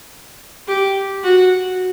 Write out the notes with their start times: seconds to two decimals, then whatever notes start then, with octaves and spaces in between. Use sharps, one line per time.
0.68 G4
1.24 F#4